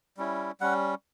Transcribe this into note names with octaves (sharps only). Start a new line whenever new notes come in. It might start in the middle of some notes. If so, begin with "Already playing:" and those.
G3 C#4 E4
G3 C#4 F#5